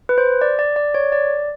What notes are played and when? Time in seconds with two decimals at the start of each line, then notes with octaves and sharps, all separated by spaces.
0.09 B4
0.18 C5
0.41 D5
0.59 D5
0.76 D5
0.94 C#5
1.12 D5